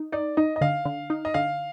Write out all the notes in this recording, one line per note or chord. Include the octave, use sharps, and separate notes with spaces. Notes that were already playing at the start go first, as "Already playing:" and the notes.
Already playing: D#4
D#4 D5
D#4 D#5
D#5
D3 F5
D3
D#4
D#5
D3 F5